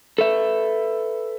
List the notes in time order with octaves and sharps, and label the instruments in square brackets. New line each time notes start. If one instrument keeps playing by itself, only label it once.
[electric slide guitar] A4 B4 E5